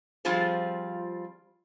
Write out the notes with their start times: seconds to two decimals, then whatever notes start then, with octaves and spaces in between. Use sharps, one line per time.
0.25 F3 G3 C4 F4 G#4 C5